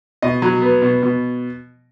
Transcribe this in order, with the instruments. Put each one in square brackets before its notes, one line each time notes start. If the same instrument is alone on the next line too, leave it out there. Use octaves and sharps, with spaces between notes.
[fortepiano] B2 D#5
F#3
B3
B2
B2